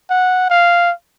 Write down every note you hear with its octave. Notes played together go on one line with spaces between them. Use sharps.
F#5
F5